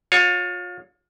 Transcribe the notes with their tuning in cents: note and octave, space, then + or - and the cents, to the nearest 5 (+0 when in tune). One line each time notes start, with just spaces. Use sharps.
F4 +35 C#5 +0